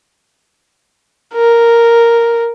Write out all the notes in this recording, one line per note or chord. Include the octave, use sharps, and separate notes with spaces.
A#4